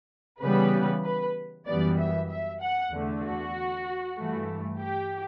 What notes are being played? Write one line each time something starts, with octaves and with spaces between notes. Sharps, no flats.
C#3 E3 G3 B3 B4
B4
F#2 E3 G3 B3 D5
E5
E5
F#5
E2 D3 A3
F#4
G2 E3 A3
G4